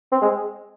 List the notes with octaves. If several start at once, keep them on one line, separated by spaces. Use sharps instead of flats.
C4
G#3